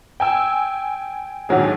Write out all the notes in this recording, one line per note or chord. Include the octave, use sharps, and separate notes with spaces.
G5 G#5 E6
D#2 G#2 D3 F#3 G#4